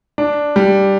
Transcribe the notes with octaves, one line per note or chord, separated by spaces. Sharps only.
D4
G3